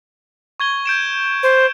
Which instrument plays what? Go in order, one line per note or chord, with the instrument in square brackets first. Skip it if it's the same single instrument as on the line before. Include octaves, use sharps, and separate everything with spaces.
[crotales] C#6 G#6 G7
G6 D7 E7
[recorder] C5